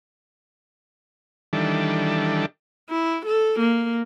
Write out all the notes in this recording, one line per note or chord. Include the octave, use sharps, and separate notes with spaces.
D#3 E3 G3 D4 A4
E4
A4
A#3